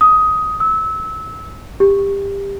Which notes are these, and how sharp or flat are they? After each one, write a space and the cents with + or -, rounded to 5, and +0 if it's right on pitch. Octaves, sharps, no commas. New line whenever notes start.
D#6 +15
E6 -25
G4 +20